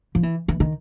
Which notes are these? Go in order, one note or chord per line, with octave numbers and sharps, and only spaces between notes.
F3
E3
E3
D#3